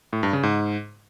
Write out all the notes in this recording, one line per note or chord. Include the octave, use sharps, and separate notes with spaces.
A2
G2
C#3
G#2